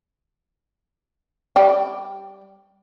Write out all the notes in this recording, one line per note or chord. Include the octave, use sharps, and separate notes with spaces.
G3 D5 G5